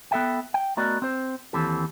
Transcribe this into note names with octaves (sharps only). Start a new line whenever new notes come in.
B3 A4 E5 G5
G5
A3 B3 F#4 A#4 D5 D#5
C4 C5
D#2 E3 C4 G4 A4